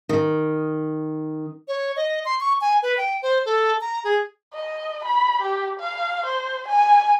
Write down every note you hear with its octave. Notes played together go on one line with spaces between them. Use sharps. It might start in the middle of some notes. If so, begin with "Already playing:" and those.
D#3
C#5
D#5
C6
C#6
G#5
B4
G5
C5
A4
A#5
G#4
D#5
B5
G4
F5
C5
G#5